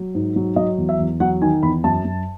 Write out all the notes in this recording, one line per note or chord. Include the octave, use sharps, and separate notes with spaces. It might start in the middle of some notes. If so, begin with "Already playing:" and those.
Already playing: F#3
G#2
F#3
F#3 D#5
E2
E5
E2
F#3 F#5
D#3 G#5
E2 B5
F#2 A5
F#2